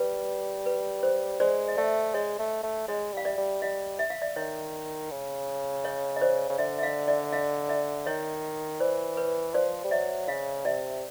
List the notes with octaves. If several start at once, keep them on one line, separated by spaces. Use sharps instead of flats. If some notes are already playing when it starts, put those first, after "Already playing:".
Already playing: G3 B4
B4
C5
G#3 C5 D5
D#5
A3 D5 E5
G#3 C#5 D#5
A3
A3
G#3 C#5 D#5
G3 F5
D5 E5
G3
G3 D#5 F5
E5
F5
D5 E5
D#3 C#5 D#5
C#3
C#5 D#5
D#5
C5 D5
C#3
D3 D5 E5
E5
D#5 F5
D5 E5
D#5 F5
D5 E5
D#3 C#5 D#5
E3 C5 D5
B4 C#5
F3 C5 D5
G3
F#3 D5 E5
C#3 D#5 F5
C3 D5 E5